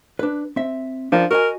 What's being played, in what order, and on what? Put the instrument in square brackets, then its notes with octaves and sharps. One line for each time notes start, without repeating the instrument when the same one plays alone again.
[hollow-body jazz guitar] D4 B4
C4 E5
[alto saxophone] F3 [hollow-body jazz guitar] D4 A#4 D5
[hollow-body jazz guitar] F#4 D#5 G#5 [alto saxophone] A#4